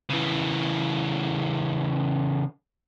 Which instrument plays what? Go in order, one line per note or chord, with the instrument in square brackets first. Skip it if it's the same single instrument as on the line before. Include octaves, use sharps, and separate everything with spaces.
[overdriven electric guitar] C#3 E3